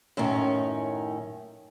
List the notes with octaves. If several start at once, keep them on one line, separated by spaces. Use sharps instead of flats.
F#2 A2 D#3 C#4